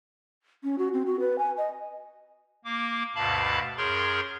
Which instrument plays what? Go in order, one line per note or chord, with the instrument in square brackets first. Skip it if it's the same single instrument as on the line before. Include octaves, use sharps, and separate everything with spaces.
[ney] C#4
F#4
C4
F#4
B4
G#5
D#5
[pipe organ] A#3 D6
D2 G2 B2 F5 A5 B5
F#2 G#4 A#4 C#5 C6 G6